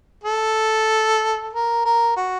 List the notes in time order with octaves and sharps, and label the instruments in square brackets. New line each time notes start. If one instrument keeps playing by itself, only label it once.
[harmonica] A4
A#4
A#4
F#4